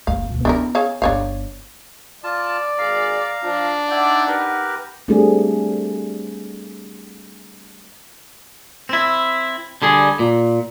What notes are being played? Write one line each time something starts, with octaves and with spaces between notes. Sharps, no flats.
F#1 D#4 F5
D2 B2
B3 C#4 D4 E4 A#4
G#4 C#5 F5
G1 D4 D#4 C#5 F5
F4 D5 A5
G#1 D#3 G#4 F5 A#5
F3 D4
D#4 E4 D5 F#5 G5
G4 A#4 B4
G3 A3 C4 D4 G4 G#4
C4 E4
D3 G3 G#4
A#2